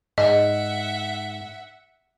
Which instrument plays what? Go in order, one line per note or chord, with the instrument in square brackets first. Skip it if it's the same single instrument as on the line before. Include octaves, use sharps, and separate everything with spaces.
[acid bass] G#2 [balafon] D#5 [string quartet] E5 F#5